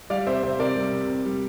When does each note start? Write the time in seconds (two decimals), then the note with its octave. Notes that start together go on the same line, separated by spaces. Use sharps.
0.10 G3 D5 F5
0.27 C3 C5 E5
0.43 C3 C5 E5
0.59 C3 A#4 D5
0.76 G3
0.93 C3
1.08 C3
1.26 G3